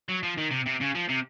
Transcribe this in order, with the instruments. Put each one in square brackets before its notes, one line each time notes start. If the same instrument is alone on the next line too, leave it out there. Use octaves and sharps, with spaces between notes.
[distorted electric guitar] F#3
F3
D#3
C3
C3
C#3
F3
C3